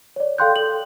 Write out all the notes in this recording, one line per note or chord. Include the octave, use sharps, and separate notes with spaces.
C#5 D5
A4 F5 G5 C6 F#6 G6
A4 F#7